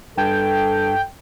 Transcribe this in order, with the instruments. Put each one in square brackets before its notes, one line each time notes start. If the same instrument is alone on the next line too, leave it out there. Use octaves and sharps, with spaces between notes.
[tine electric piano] G2 A5 G#6 [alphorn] A4 [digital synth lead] G5